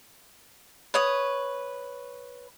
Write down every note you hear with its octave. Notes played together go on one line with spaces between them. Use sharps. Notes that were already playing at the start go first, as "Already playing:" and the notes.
B4 C#5 D#6